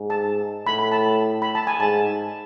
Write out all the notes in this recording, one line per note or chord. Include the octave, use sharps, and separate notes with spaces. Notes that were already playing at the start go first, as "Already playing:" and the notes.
Already playing: G#2
A5
A2 B5
B5
A5
B5
A5
G#5
G#2 A5